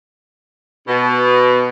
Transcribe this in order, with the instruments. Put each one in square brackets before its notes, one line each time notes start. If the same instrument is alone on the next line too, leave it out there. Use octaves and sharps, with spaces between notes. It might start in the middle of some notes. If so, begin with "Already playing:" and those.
[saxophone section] B2